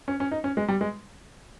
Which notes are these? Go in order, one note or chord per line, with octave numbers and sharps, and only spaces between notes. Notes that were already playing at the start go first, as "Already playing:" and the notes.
C#4
C#4
D#4
C#4
G#3
G3
G#3